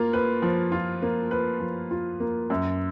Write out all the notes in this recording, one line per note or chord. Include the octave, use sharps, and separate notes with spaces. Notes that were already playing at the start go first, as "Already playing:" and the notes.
Already playing: A#3 F4
B4
F3
F4
A#3
B4
F3
F4
A#3
F#2